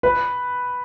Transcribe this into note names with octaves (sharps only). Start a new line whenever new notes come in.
B4